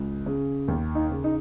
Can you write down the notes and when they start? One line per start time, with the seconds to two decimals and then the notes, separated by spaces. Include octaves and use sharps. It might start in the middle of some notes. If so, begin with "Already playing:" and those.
Already playing: C#2
0.26 C#3
0.68 D#2
0.95 D#4
1.10 C#3
1.24 D#4